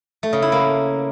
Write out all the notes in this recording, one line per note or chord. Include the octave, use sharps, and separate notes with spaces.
A3
C#3
E4
A#3